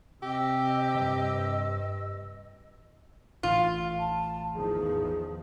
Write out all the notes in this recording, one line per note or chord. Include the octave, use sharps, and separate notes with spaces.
C3 G4 D#5 E6
G2
A1 F4
A5
E2 D#3 F3 G#4